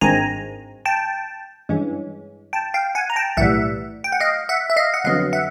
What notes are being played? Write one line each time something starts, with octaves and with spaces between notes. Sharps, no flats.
G#1 G2 D#3 G#3 C4 G#5 A#5
G5 A5
G2 E3 G#3 C#4
G5 A5
F5 G5
F#5 G#5
A#5
G5 A5
B1 A2 E3 G3 E5 F#5
G5
F#5
D#5 F5
E5 F#5
E5
D#5 F5
F#5
F2 D3 F#3 B3 D#5 F5
E5 F#5